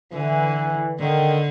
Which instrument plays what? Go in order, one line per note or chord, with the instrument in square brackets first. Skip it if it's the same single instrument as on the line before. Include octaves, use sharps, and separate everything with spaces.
[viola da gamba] D3 [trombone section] E3
[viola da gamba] D3 [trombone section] D#3